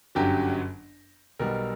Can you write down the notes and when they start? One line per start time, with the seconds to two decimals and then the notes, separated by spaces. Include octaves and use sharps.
0.15 G1 F#2 D3 F#3 G4
1.39 B1 B2 G3 A#4